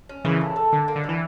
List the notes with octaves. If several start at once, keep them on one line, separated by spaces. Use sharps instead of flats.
C#4
A#2 C#3 E3
A3
A4
D3 A#3
A#3
D3
E3 G3